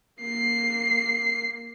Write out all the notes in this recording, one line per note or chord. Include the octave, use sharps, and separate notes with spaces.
A#3 C7